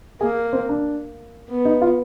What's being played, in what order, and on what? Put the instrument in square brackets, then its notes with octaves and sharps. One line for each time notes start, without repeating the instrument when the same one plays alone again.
[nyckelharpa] A#3 [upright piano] G#4
[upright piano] C4
D4
[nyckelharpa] B3
[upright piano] D#4
F4